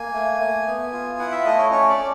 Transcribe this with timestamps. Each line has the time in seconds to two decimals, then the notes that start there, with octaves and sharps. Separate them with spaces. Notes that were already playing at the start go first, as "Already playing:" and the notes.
Already playing: A#3 G#5
0.14 A3
0.40 A3
0.66 B3
0.93 F4
1.19 E4 F#5
1.32 E5
1.45 A3 D#5
1.58 C#5
1.71 C#4 C#5
1.89 D5
1.97 C#4